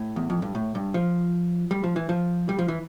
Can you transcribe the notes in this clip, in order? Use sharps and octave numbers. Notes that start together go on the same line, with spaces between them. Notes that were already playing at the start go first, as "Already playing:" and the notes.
Already playing: A2
E2
F2
G2
A2
G2
F3
G3
F3
E3
F3
G3
F3
E3